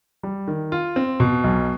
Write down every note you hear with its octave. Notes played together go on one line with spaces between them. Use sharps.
G3
D#3
F4
C4
B2
B1